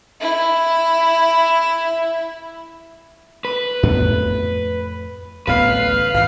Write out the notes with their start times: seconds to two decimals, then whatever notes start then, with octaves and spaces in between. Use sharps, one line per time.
0.21 E4 E5
3.45 B4
3.83 F2 A2 B3
5.47 D1 A1 B3 B4 F5
6.14 G#1 E3 F5